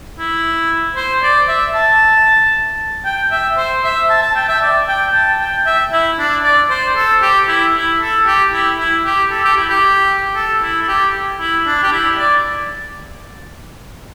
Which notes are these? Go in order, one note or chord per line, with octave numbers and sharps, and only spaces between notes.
E4
C5
D5
E5
A5
G5
E5
C5
E5
A5
A5
G5
E5
D5
G5
A5
G5
E5
E4
D4
D5
C5
A4
G4
E4
E4
A4
G4
E4
E4
G4
A4
G4
E4
G4
A4
E4
A4
G4
E4
D4
G4
E4
D5